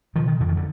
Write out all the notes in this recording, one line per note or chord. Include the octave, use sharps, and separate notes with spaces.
B2 D#3 F3
D#3
F2 D3
D#3
D3